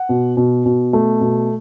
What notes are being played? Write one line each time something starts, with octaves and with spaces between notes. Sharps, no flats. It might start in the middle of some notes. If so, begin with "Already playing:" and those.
Already playing: F#5
B2
B2
B2
A3
B2